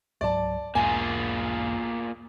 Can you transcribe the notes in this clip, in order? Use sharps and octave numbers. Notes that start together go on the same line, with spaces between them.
C#2 G#2 F#3 D5 A5
B1 E2 G#2 A#3 F4 G#4 G#5